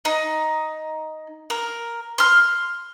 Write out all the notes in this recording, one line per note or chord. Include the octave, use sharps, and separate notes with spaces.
D#4
A#4
C6 F6